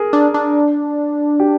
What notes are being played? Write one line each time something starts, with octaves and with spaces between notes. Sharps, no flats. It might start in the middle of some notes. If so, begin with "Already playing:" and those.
Already playing: G#4 A#4
D4
D4
G4